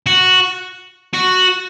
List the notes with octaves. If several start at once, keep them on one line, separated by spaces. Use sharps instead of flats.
F#4
F#4